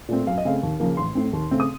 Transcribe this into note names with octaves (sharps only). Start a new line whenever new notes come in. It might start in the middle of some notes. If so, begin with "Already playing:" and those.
A#2 A3 C4
F#2 F5
D#5
C#3 A3 C4 F5
D#2
C#3 F3 A#3
A1 C6
A2 A3 C4
D#2
C#3 A3 C4
D#6